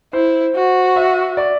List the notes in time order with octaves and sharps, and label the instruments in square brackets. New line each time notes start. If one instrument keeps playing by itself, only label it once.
[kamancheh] E4 [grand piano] C5
[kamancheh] F#4
[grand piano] E5
D5